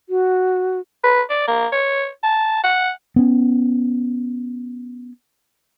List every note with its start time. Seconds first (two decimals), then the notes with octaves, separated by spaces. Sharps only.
0.09 F#4
1.04 B4
1.30 D5
1.48 A#3
1.73 C#5
2.23 A5
2.64 F#5
3.16 B3 C#4